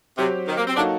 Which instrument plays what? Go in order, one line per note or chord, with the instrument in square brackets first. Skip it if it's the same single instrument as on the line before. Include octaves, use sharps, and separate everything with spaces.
[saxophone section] C3 [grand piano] F#3 C4 G4
[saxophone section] D#3
A#3
C4
[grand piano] F#3 A#3 D#4 F#4 A4 [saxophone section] D4